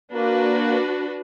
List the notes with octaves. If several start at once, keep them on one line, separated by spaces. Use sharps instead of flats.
A#3 D4 F#4 B4